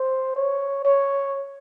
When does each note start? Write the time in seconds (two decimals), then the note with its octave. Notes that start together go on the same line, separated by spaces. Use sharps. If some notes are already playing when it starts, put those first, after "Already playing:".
Already playing: C5
0.36 C#5
0.85 C#5